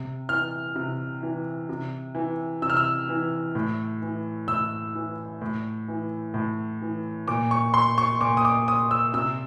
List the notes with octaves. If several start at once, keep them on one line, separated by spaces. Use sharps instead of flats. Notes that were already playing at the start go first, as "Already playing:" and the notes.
Already playing: C3
E3 F6
C3
E3
C3
E3
C3 E6
F6
E6
E3
A2
E3
A2 E6
E3
A2
E3
A2
E3
A#2 D6
C#6
C6
C#6
A#2 D6
D#6
D6
D#6
E6
C3 E6